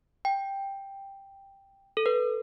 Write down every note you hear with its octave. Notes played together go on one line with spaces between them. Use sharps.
G5
A4
B4